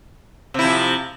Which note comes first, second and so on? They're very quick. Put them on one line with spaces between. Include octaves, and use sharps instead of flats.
C3 E4 F3